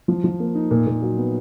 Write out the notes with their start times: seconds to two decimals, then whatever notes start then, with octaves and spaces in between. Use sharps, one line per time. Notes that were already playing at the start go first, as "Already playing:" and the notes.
0.08 F3
0.24 F3
0.40 A#3
0.55 D#4
0.71 A#2
0.87 A#2
1.02 F#3
1.18 B3